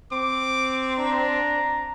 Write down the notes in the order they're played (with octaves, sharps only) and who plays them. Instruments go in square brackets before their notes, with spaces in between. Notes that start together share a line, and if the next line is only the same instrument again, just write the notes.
[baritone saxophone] C4 [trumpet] D6
[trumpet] D4 [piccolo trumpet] A#5